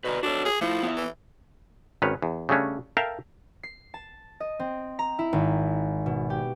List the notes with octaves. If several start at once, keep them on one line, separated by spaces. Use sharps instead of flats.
B2 B4 D5 A#5
D4 F#4 A4 C#5
G#4
A2 F3 E4
B3 E4 E5
E3
G#1 D#3 C#4 B4 C#5
E2
C#3 G3 A3 C#4 D4
A4 A#4 E5 F5 G5
C7
A5
D#5
C4
A#5
E4
G#1
B2
G4